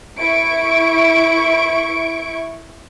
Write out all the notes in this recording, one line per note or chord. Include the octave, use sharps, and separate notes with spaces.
E4 C#6 D7